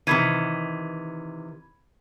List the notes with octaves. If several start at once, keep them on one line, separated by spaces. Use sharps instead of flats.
C3 D#3 E3 B5 G#6 D#7